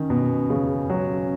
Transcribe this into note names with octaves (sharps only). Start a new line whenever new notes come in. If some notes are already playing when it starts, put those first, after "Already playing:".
Already playing: D#3 C#4
B2
C#3
F#3